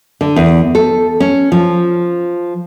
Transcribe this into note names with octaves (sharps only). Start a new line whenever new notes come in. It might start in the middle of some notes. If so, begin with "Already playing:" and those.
D3
E2
A4
C#4
F3